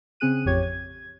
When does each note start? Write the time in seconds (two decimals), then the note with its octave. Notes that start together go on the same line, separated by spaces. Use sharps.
0.20 C#3 C4 G#4 F#6 D#7
0.45 A1 F2 G4 C#5 G#6
0.63 G#6